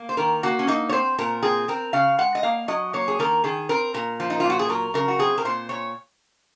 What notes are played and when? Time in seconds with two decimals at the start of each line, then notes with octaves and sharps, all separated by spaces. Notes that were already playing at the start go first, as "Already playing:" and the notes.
Already playing: A#3
0.09 C5
0.17 D#3 A#4
0.43 A#3 F#4
0.59 C#4
0.67 A#3 D#4
0.89 C#5
0.92 C4 C5
1.18 A#2 A#4
1.43 C4 G#4
1.68 C4 A#4
1.93 C#3 F5
2.18 G#3 F#5
2.35 D#5
2.43 A#3 F5
2.68 F#3 D#5
2.93 A#3 C#5
3.08 G#4
3.19 D#3 A#4
3.44 D#3 G#4
3.69 C4 A#4
3.94 A#2 A#4
4.20 F3
4.30 D#4
4.40 A#2 F4
4.50 F#4
4.59 G#4
4.69 F#3 A#4
4.94 C#3 A#4
5.08 F#4
5.19 C4 G#4
5.38 A#4
5.45 A#2 C5
5.69 A#2 C#5